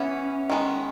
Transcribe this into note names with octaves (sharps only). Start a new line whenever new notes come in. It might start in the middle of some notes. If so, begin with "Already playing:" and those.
Already playing: E3 B3 C#4 E4
D#3 G#3 B3